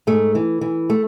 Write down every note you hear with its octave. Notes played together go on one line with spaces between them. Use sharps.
G#2 A3
E3
E3
A3